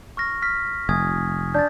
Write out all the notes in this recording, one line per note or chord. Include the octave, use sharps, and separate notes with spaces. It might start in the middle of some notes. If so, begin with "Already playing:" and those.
C#6 F6 A#6
F6 B6
F1 G#5 D#6 G#6
D4 G6 A6